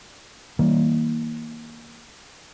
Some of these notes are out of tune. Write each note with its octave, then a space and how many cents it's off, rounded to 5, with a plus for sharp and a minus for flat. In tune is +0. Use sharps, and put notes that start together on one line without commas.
D#3 +45 G3 -25 A#3 +0